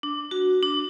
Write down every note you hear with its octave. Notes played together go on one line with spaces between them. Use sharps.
D4
F#4
D4